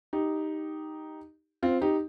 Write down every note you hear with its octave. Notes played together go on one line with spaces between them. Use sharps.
D#4 G4
C4 F4
D#4 G4